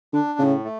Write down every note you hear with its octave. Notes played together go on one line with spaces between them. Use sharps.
D3 D4
A2 C#3
A3